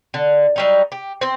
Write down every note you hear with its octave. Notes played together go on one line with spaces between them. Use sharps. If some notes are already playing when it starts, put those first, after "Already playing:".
D3
F#3 G3 D#4
G4
C4 C5